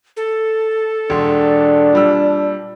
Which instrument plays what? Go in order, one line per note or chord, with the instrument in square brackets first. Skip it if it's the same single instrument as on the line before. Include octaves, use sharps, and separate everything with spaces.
[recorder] A4
[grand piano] E1 C6 [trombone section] D4
[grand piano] A#2 G3 E6